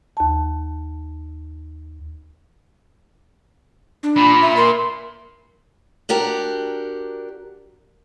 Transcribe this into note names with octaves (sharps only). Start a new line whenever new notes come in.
D#2 A5
D4
A#2 B5
E5
A#4 C6
D4 F#4 G4 A#4